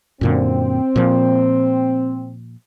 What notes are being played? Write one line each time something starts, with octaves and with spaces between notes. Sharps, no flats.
F#2 A#2 D3 C4
A#2 F3